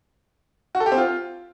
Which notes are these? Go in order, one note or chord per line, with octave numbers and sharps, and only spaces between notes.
F#4
A4
G4
C4
F4